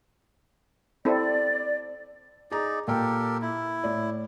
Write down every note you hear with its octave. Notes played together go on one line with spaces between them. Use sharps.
C4 E4 A4 D5
D#4 G#4 D5 A#5
A#2 G4 A4 A#4 G5
E4
A2 D5